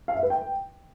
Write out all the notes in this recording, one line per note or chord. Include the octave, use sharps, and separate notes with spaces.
F5
E5
B4
G5